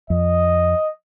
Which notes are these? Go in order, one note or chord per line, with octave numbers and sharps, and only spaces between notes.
F2 D#5